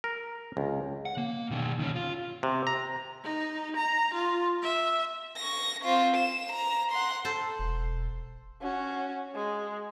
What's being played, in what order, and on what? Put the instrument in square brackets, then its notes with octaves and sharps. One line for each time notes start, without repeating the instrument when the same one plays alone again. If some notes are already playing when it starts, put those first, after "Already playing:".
[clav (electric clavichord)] A#4
C#2
[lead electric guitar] F#5
A#3
B2 D#3
D#3 C#4
F4
[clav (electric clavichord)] C3
A#5
[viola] D#4
A#5
F4
E5
[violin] C#6 A#6
C4 F4
E7
A#5
F#5 C6
[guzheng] A4 C5
[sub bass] E1
[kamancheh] C#4 F#4
G#3